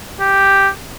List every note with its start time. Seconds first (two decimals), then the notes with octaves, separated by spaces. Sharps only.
0.20 G4